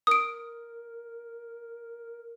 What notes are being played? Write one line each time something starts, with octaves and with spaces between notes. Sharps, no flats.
A#4 D#6 D7